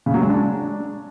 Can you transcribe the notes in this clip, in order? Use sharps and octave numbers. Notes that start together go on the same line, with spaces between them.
C#3
F#3
G#3
D4